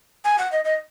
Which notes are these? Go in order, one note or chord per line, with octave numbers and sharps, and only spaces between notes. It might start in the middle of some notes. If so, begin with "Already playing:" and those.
G#5
F#5
D#5
D#5